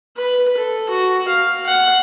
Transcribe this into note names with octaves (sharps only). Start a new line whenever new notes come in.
B4
A4
F#4
F5
F#5